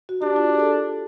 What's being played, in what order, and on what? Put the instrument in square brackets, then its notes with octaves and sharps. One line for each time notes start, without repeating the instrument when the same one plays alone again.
[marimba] F#4
[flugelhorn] D4 [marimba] G4
[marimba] F4
G4
G#4
A4